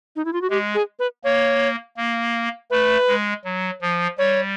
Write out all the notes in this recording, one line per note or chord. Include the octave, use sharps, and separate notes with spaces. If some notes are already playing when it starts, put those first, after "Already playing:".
D#4
E4
F4
F#4
G#3 G4
G#4
B4
A#3 C#5
A#3
A3 B4
G#3
F#3
F3
G3 C#5